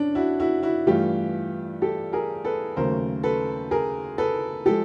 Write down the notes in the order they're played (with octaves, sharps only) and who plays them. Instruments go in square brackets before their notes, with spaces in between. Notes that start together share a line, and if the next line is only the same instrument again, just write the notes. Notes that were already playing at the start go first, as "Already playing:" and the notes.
Already playing: [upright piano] C#4 D4
E4 F#4
E4 F#4
E4 F#4
G2 E3 A3 F4 G4
G4 A4
G#4 A#4
A4 B4
D#2 C#3 F#3 A3 A#4 C5
A4 B4
G#4 A#4
A4 B4
F3 G#3 G4 A4